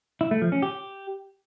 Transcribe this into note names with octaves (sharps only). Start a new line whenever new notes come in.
E4
A3
F3
C#4
G4